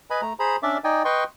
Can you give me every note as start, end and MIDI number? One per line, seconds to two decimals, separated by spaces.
0.10 0.21 71
0.10 0.21 75
0.10 0.21 80
0.10 0.21 83
0.22 0.33 57
0.22 0.33 82
0.39 0.56 68
0.39 0.56 72
0.39 0.56 82
0.39 0.56 83
0.63 0.78 61
0.63 0.78 62
0.63 0.78 74
0.63 0.78 76
0.63 0.78 86
0.84 1.03 63
0.84 1.03 74
0.84 1.03 75
0.84 1.03 79
0.84 1.03 80
1.05 1.24 71
1.05 1.24 75
1.05 1.24 79
1.05 1.24 84
1.05 1.24 85